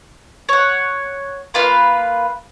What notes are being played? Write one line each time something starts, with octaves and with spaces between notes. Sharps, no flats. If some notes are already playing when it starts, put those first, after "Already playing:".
C#5 F#5
A#3 F4 B4 F5